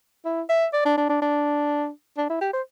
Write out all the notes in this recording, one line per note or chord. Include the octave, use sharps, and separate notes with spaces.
E4
E5
D5
D4
D4
D4
D4
D4
E4
G4
C5